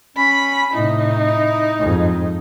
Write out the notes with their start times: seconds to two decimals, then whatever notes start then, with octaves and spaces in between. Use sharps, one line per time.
0.17 C#4 B5
0.74 A2 C3 D#4 E4
1.80 F2 G#2